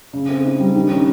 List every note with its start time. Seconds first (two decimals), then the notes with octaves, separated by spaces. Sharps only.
0.13 C#3
0.29 C4
0.44 D#4
0.60 G3
0.75 D#3
0.91 C#4